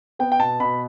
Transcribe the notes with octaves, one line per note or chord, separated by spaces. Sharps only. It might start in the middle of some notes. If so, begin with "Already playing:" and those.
B3 G5
G5
B2 A5
B2 B5